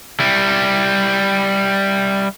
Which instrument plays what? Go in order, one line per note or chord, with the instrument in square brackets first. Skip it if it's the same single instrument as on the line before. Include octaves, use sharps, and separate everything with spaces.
[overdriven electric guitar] G3 E4